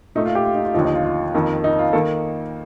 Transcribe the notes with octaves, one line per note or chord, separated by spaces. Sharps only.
A#2 A3 D#4
F4
G4
F4
D#4
F4
D#2 D3 F3 D#4
D#4
F4
F4
F2 D#3 A#3
D#4
F4
D#3 A#3 A4